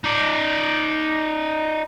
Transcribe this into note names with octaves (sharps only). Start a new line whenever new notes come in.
D#4 D5